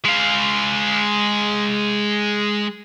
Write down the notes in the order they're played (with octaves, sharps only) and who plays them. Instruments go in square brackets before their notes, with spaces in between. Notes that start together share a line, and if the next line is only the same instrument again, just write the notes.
[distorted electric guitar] G#3 F5